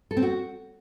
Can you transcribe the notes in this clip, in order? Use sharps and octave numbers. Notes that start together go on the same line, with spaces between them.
A4
C4
F#4